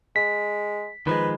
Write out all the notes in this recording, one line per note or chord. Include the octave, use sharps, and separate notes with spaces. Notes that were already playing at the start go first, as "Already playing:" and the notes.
G#3 B6
D#3 F3 G#3 B4